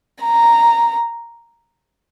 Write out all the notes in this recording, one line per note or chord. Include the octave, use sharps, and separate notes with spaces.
A#5